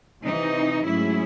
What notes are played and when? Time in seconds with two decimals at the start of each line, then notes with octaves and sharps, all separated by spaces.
0.23 C3 E3 C4 D#4
0.84 G#2 F#3 A3 C#4 E4 G#4